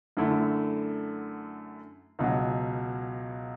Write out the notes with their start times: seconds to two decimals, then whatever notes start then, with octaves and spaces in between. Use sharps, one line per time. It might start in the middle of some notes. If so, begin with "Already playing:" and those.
0.17 F#2 D3 A3 E4
2.19 C#2 B2 F#3